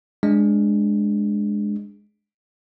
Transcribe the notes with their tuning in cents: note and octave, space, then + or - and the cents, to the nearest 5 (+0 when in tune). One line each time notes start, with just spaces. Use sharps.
G#3 +0 D4 +0